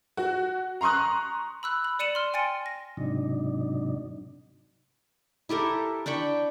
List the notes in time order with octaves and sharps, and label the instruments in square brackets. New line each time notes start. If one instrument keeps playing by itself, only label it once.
[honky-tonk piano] F#4
A#5 C6 C#6 D#6 F#6
[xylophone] B5 E6 F#6
B5
D5 C#7 D#7 E7 F#7
C6 F6
G5 G#5 C6 A6 C#7 D#7
A#6
[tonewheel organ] G#2 C3 F#3 D4 D#4
[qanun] E4 G4 A4 A#4
D4 G5 B5 C#6